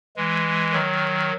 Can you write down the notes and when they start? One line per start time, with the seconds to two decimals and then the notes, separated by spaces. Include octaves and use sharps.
0.16 E3 G#3
0.73 D#3 F#3